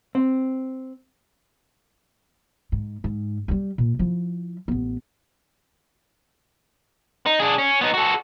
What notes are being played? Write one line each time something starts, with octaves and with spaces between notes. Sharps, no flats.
C4
G#2
G#2
F#3 G3
A#2
F3 E4
A1 B3
D#4
D4 G#4
C#4
B3 D#4
F#4 A4